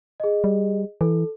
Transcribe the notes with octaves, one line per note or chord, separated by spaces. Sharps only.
G#4 D#5
G3
E3 A4